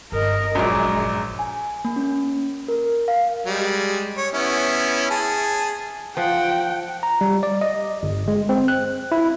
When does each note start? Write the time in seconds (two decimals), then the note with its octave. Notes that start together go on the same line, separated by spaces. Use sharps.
0.12 G1 A#4 D#5
0.55 A#1 F#2 F#3 G#3 A#5 D6
1.39 G#5
1.85 A#3
1.96 C#4
2.68 A#4
3.08 F5
3.46 G3 G#3
4.17 C#5
4.34 B3 C#4 E4
5.10 G#4 A5
6.17 F3 F#5 G5
7.03 A#5
7.21 G3
7.43 D5
7.61 D#5
8.03 G1
8.28 G#3
8.49 C4
8.68 F#6
9.12 E4